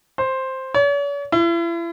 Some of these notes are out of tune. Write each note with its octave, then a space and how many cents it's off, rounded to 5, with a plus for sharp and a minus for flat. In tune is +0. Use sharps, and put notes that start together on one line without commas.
C5 +5
C#5 +45
E4 +40